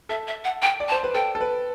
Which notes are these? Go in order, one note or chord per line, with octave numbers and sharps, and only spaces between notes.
A4 E5
E5
F#5
G5
D5
A5
C5
B4
A4 G5
A4
B4